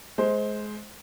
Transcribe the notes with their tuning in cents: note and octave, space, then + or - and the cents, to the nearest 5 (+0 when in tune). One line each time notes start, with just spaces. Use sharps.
G#3 +25 C5 +0